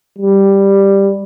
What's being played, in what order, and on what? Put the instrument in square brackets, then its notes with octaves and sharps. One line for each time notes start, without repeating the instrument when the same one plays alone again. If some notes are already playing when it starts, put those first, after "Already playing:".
[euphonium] G3